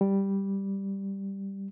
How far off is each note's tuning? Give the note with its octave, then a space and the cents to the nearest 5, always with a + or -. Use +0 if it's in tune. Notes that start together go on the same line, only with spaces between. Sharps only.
G3 +0